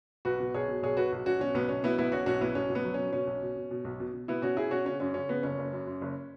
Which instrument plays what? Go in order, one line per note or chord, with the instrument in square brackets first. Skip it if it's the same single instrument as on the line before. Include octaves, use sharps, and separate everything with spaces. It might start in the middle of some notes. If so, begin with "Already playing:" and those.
[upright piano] B1 F#4 B4
B2
B1 G#4 C#5
B2
B1 G#4 C#5
B2 F#4 B4
B1
B1 C#4 F#4
B2 C#4
B1 B3
B1 C#4
B2 B3 E4
B1 B3 E4
B2 C#4 F#4
B1 C#4 F#4
B1 B3 E4
B1 C#4
B1
B3
F#3
B2 C#4
B2 C#4
B1
B2
B2
B2
B1
B2
B2
B2 B3 E4
B2 C#4 F#4
B2 E4 G#4
B2 C#4 F#4
C#3 C#4
F#2 C#4
C#3 C#4
C#3 B3
F#1 C#4
F#1
F#2
F#2
F#1